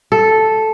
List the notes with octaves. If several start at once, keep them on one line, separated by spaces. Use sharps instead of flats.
A4